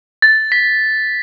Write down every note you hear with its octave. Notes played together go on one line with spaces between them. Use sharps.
A6
B6